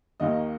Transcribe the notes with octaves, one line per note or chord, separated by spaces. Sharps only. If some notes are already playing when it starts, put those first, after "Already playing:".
D#2 D#3 A#3 D#5